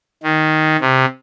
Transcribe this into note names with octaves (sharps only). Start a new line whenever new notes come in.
D#3
C3